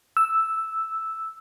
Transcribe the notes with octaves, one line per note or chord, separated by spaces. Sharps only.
E6